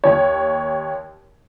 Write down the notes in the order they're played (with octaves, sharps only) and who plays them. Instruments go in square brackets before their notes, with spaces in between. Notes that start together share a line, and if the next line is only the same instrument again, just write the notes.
[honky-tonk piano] D#2 C#5